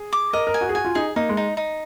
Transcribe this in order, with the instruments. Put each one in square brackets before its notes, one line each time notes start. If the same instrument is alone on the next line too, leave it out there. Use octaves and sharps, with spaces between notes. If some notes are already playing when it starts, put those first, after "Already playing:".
Already playing: [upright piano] G#4
[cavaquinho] D6
[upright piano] A#4 [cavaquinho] D#5
[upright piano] A#4
[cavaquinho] G#5
[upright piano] F#4
G#4
[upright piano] F#4 [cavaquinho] G#5
[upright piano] F4
[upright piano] D#4 [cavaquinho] G#4
[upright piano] A#3 [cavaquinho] D#4
[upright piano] G#3
[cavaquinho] D#4
D#4